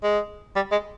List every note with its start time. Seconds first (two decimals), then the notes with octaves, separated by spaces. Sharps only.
0.03 G#3
0.56 G3
0.72 G#3